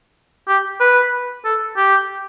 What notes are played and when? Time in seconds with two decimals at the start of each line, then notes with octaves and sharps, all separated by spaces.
0.48 G4
0.80 B4
1.45 A4
1.77 G4